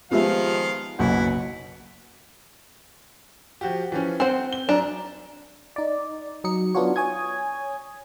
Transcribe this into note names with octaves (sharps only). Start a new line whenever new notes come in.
D#3 F3 G#3 B3 F4 G4 E5 F5
F#1 B1 F#2 B2 A#3 E4 F#5
F3 F#4 G4
E3 F3 C#4
C4 C5 F#5
G7
F#2 D4 A#5
D#4 D5
F#3 D#4 D#5 C#7
B3 D4 F4 F#4 C#5
C#5 G#5 D#6 G#6